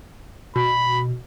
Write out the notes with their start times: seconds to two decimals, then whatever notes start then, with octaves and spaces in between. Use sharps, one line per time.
0.56 B2 B5